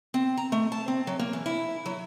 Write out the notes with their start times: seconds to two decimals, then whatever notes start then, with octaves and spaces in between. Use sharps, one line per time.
0.14 C4
0.37 A#5
0.52 A3
0.72 A5
0.88 C4
1.07 F#3
1.19 A#3
1.33 E3
1.46 E4
1.86 F#3